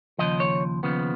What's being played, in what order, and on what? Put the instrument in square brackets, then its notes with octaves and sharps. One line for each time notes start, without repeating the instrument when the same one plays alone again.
[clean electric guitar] D#2 C#3 F3 D#5
C#5
D#2 C#3 F3 B3